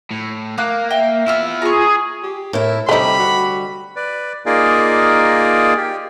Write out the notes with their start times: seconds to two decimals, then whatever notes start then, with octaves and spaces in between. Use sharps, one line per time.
0.11 A2
0.58 A#3 F5 D6 F#6
0.91 E5 G5
1.27 B3 E4 F4 E6 F6
1.62 F4 G#4 A#5 C#6
2.23 G4
2.53 A2 E4 A#4
2.89 D2 C3 G3 A3 D#4 B5
3.19 F#4
3.96 B4 D5
4.46 A#3 D#4 F4 G#4 A#4 D5
5.77 G4